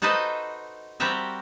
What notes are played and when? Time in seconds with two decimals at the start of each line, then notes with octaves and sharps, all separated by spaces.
0.02 D#4 F#4 A4 B4 C5 D#5
1.00 G3 C4 F#4 G4 A#4 E5